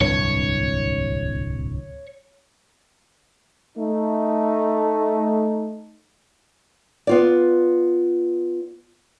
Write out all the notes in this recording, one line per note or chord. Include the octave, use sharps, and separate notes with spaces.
D1 C2 G2 C#5
A3 D#4
B3 F4 D5